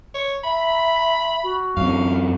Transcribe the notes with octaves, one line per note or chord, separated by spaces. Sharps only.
C#5
E5 B5
F#4
F#2 C4 F5